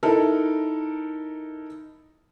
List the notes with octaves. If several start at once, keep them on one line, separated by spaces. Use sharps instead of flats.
D#4 E4 A4 A#4